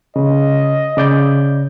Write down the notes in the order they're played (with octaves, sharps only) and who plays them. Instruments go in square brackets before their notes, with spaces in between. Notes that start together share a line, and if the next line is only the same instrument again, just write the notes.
[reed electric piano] C#3 [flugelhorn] D#5
[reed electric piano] C#3 D5 G6